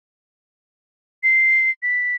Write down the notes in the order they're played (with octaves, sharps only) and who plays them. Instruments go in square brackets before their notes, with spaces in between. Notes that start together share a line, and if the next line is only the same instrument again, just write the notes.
[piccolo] C7
B6